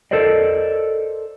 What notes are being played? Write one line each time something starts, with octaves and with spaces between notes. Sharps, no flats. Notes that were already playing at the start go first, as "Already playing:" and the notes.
A4 A#4 C5 D5 D#5